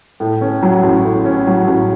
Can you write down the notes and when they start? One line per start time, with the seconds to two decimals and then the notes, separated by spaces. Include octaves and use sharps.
0.20 A2
0.41 C#4
0.63 F#3
0.83 A1
1.05 A2
1.25 C#4
1.47 F#3
1.68 A1